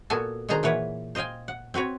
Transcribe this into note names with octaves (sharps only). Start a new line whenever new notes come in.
A#2 B3 F#4 A4 G#5 A5
B2 D#3 D4 G#4 C5 A#5
A#2 E3 B4 C#5 F#5
C5 D#5 F5 G5 G#5
F#5
C4 F#4 B4 C#5